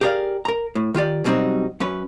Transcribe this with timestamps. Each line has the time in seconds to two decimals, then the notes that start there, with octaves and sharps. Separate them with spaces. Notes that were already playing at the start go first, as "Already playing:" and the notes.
0.01 G4 G#4 A#4 C#5 D5 F5
0.45 A#4 A#5
0.75 A2
0.94 D#3 F4 G4 D5
1.24 B2 F#3 G3 C4 D#4 F#4
1.80 F#2 C#4 B4